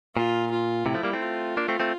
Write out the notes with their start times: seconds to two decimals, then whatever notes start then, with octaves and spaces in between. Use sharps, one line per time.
0.15 A#2 F4
0.51 F4
0.86 A2 C3 E4
0.94 F3 A3
1.03 G3 A#3
1.13 A3 C4
1.22 F4
1.57 A#3 D4
1.68 A3 C4
1.80 A3 C4